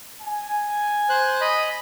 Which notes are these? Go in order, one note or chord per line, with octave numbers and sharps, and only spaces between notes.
G#5
C5 F#6
D#5 B5